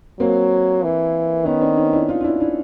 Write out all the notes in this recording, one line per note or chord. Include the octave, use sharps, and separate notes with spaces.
F#3 A#3 C4
E3
D#3 B3 C#4
C4 D4
C#4 D#4
D4 E4
D#4 F4
F4
D4 E4
D4 E4